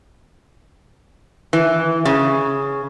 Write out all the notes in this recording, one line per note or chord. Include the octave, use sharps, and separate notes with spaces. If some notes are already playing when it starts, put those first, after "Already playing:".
E3
C#3